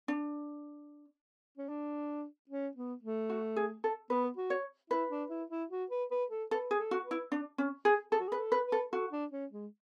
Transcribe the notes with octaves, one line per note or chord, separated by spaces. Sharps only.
D4
C#4
D4
C#4
B3
A3
F#4
G#4
A4
B3 B4
F#4
C#5
E4 B4
D4
E4
E4
F#4
B4
B4
A4
A4 B4
G#4
A4
F#4
B4
E4
D4
C#4
G#4
G#4 A4
F#4
G#4
B4
A4
B4
B4
A4
F#4 A4
D4
C#4
G#3